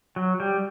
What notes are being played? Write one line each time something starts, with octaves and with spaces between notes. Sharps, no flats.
F#3
G3